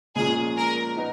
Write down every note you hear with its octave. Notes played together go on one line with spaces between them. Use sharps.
A#2 F3 G#3 C#4 F4 G#4
A#4
B3 D#4